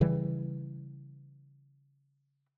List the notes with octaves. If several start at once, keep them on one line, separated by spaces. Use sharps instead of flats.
C#3 E3 G3